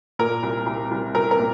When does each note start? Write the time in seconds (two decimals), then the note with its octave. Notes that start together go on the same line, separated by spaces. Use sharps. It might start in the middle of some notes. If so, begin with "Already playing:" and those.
0.19 A#2 A#4
0.43 C2
0.66 C2
0.91 C2
1.15 C2 A#4
1.31 A#4
1.39 A#2